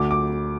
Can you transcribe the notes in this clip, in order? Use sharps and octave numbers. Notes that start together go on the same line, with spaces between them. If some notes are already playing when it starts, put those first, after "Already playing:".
Already playing: D2 D6
D6